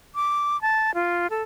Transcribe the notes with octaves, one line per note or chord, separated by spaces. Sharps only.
D6
A5
F4
A4